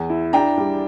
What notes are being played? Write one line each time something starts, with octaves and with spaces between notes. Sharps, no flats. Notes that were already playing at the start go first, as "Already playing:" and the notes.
Already playing: E2
E4
D4 G5 A#5
G3